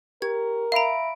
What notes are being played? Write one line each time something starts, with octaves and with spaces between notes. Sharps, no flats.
G4 A#4 G#6
E5 F5 A#5 B5 D7